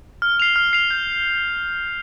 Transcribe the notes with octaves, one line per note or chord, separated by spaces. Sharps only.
F6
C7 F7
F6
C7 F7
G6